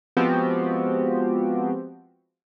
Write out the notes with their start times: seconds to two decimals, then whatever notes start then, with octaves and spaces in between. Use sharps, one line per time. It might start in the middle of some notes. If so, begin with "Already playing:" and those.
0.17 F3 G#3 B3 C4 F#4 G4